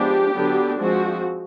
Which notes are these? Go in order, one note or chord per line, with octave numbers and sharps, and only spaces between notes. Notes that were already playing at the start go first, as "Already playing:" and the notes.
Already playing: F3 G#3 B3 D4 G4
D3 F#3 B3 D4
F3 G#3 C4 F#4